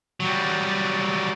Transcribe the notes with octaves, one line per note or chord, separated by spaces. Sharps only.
F#3 G3